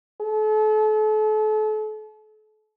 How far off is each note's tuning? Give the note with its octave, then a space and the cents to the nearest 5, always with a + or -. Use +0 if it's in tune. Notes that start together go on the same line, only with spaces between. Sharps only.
A4 -35